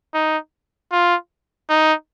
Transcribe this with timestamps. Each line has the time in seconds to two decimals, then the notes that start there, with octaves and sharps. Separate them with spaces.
0.14 D#4
0.92 F4
1.70 D#4